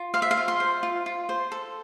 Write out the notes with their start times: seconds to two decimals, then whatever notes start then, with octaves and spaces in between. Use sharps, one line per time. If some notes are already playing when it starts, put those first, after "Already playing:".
Already playing: F4
0.14 C5 F5
0.22 E5
0.31 F5
0.37 F4
0.48 C6
0.60 C5
0.83 F4
1.06 F4
1.29 C5
1.52 A4